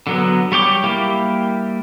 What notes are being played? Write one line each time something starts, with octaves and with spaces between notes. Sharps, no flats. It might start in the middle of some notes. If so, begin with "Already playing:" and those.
D3 F#3 B3
G3 C#5 G5 D6
G3 A#3 E4 G4